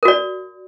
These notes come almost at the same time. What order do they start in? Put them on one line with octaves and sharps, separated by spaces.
A#4 F#4 D5